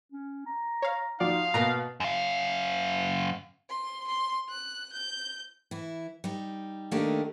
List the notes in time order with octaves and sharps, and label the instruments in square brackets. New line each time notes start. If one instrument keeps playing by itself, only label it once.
[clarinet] C#4
A#5
[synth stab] C#5 F5
[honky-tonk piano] F3 F#4 [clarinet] D#4 [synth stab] D5 [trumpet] F5
[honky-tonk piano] B2 [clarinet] A#3 [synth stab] A#4 B4 A#5
[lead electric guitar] F#2 F5
[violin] C6
C6
F#6
G6
[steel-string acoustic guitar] E3 E4
G3 D#4
D#3 A3 A#3 D4 D#4 G4